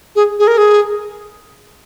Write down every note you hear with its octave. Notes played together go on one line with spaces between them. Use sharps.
G#4
G#4
A#4
G#4